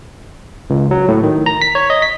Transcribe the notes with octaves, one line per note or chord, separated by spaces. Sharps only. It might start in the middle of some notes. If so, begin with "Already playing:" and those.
C#2
F#3
A2
D#3
A#5
B6
C#5
D#5
B6